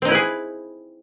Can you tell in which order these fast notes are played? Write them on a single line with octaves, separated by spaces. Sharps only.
C4 D#4 E4 B4 G#4